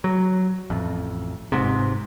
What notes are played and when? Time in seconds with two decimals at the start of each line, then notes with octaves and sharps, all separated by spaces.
0.04 F#3
0.70 A1 F2
1.52 G1 G#2 C3